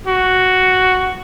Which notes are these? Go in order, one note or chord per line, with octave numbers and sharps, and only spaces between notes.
F#4